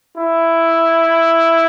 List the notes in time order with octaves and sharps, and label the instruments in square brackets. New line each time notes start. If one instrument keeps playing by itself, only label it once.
[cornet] E4